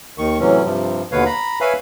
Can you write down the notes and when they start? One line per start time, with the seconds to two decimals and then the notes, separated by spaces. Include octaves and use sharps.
0.18 D#2 D#3 C#6
0.40 A2 C3 E3 F#3 C#4
0.64 G2 C3 F3
1.12 D#2 B2 D3 B4 C#5 F5
1.26 A#5 B5
1.61 B4 C#5 E5 F5 G#5 B5